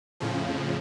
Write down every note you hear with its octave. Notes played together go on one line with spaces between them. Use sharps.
F2 A2 C#3 F3